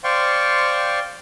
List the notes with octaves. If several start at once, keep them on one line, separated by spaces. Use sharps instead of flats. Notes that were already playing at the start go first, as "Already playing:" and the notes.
C5 D5 F5 G5 C6 C#6